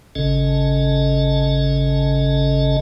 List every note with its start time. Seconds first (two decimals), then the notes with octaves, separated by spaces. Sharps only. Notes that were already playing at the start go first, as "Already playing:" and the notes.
0.15 G#1 C#3 C#4 A4 D#5 A5